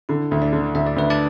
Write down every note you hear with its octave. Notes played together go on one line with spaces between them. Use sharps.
D3 E4
D2
D4 D5
D3
D2 E5
D5
D2 B4
D4 D5